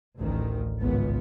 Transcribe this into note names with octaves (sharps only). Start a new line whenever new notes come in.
A1 D2 D#3
G#1 C#2 B3